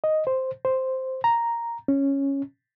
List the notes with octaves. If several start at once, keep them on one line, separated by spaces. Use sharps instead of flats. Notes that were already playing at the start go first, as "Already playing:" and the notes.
D#5
C5
C5
A#5
C#4